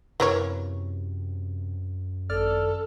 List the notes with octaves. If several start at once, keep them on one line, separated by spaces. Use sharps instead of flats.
F#2 C3 E3 A#3 C#5
G#1 A4 D5 F6